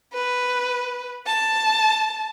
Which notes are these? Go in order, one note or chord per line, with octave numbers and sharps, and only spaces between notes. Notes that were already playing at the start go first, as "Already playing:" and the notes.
B4
A5